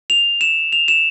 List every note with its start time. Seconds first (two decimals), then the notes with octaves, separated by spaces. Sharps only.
0.10 F7
0.41 E7
0.73 F7
0.88 E7